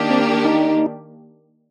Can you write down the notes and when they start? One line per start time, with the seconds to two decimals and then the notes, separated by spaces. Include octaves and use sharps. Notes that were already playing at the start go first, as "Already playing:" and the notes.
Already playing: D#3 A#3 D4 G4
0.10 C4
0.45 D#4